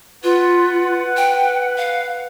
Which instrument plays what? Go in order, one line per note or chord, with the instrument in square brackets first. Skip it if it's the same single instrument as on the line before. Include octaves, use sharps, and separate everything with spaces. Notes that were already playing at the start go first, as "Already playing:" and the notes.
[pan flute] F4 [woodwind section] B4 F#5
[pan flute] G5
F5